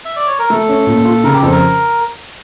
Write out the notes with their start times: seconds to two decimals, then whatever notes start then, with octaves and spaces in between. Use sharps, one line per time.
0.05 E5
0.16 D5
0.27 C#5
0.39 A#4
0.50 A3 A4
0.69 C#4
0.86 A#2
1.05 F4
1.24 C#3 A#4
1.33 G4
1.42 F2 A4
1.51 A#4